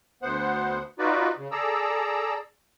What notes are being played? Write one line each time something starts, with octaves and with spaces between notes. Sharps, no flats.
D2 B3 C5 F#5
D#4 F4 F#4 B4 D5
C#3
G#4 A4 D5 A#5 E6